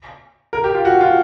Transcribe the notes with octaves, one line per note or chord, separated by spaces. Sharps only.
A#4
G4
F4
F#4
F4